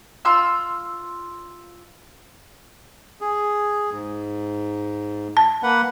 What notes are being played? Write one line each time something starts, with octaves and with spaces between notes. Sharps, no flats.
F4 C6 E6
G#4
G#2
A5
A#3 B4 F#5